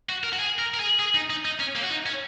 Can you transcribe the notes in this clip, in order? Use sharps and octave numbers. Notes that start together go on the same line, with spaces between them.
F#4
A#4
F#4
G#4
A#4
A#4
G#4
G#4
D#4
D#4
D#4
C#4
A#3
F#4
D#4
C#4